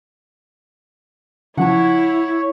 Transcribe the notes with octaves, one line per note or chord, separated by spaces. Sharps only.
C#3 F3 E4 C#5 F#5 A5